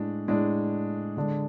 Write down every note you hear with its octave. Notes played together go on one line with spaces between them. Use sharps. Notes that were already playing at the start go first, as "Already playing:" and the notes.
Already playing: A2 G#3 D4
A2 G#3 D4
D3 G#3 D4